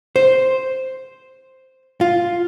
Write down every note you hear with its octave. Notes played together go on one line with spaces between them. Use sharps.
C5
F4